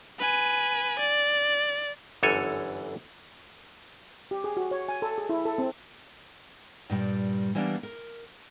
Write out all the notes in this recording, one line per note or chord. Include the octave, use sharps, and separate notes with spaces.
B4 G#5
D5
G1 F#2 E3 A4 C#5 G#5
G4
G#4
F#4
C#5
G#5
A4
G#4
E4
A4
C4
G2 A#2 G3
E3 G3 A#3 B3 D4
A#4